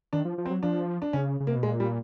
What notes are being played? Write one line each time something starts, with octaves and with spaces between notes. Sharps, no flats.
D#3 D4
F3
F3
C4
F#3
F3 D4
D4
C#3 C#4
C#3
C3 A#3
B2
A#2 G#3
G3